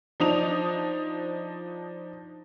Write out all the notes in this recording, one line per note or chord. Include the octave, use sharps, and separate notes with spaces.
F3 D4 D#4 D#6 F7